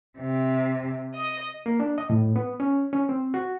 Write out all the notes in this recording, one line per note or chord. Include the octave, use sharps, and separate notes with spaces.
C3
D#5
A#3
D4
D#5
A2
B3
C#4
C#4
C4
F#4